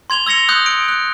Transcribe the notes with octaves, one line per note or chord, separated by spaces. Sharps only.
C6 G#6 F7 G7
E6 G#6 A#6 C#7 F7
C6 D#6 F#6 G6
D7
F#6